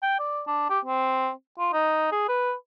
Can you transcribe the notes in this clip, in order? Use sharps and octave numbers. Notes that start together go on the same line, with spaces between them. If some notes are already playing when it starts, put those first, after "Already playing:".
G5
D5
D4
G4
C4
F4
D#4
G#4
B4